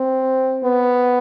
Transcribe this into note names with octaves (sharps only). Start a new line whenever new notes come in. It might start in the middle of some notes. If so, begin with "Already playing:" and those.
Already playing: C4
B3